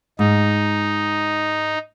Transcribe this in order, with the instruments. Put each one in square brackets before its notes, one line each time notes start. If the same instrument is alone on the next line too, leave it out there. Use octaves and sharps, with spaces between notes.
[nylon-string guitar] G#2 [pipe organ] D#4